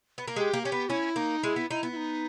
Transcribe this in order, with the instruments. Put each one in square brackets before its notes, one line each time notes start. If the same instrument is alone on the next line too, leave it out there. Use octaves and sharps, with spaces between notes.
[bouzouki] B3
A#3
[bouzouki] G#3 [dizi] G4
[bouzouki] A#3
[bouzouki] C#4 [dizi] G4
[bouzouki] B3
[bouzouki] C#4 [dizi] E4
[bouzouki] A#3 [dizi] D#4
[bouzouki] G#3 [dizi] E4
[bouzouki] B3
[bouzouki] D#4 [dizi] E4
[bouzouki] B3
[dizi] E4
D#4